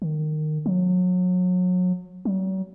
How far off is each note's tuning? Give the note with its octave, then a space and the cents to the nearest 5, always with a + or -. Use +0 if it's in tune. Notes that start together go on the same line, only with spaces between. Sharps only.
D#3 -20
F#3 -30
F#3 +40